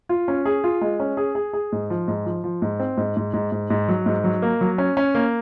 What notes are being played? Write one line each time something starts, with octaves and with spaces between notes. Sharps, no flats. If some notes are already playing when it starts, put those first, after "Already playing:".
F4
C#4
G#4
F4
G#3
C#4
G#4
G#4
G#4
G#2
F3
G#2
F3
F3
G#2
C4
G#2
G#2
G#2
G#2
G#2
F#3
G#2
F#3
A#3
F#3
C#4
C#4
A#3